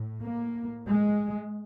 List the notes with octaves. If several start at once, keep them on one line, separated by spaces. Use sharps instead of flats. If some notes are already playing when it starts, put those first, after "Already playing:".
Already playing: A2
A#3
G#3